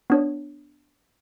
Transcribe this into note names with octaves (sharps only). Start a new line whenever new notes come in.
B3 D4 C#5